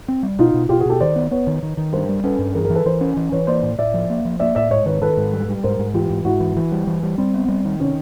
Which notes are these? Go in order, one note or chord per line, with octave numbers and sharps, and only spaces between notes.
C4
G3
B2 D#4 F4
B2
B2 F4 G4
F#4 G#4
B2 G4 A4
D#3 C5 D5
B3
B3 B4 C#5
D#3
D#3
D#3
G2 A#4 C5
G3
C#4 A4 B4
G2
E3 G#4 A#4
G#4 A#4
E3
A4 B4
E3 A#4 C5
C#4
E3
E3 B4 C#5
A#3 C5 D5
A2
A2 D5 E5
F3
A#3
F3
A#3 D5 E5
A2 D5 E5
G#2 C#5 D#5
D#3 B4 C#5
D#3 A4 B4
G#2
G3
G3
G#2 A#4 C5
G#2
E3 F4 G4
G#2
G#2 E4 F#4
E3
E3
G3
E3
G3
G3 C4
B3
G3
D#3
C3 C#4